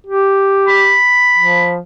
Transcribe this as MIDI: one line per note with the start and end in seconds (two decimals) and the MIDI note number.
0.06 0.96 67
0.67 1.71 83
1.37 1.78 53